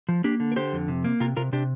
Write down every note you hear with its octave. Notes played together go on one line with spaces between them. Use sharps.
F3
A#3 D4 G4
D3
A#4
D3 G4 C5
F2
C3
A#3
C3 F4 A#4
C3 F4 A#4
C3 D4 G4